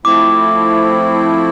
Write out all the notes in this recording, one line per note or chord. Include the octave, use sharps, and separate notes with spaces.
F3 A3 C4 E4 D6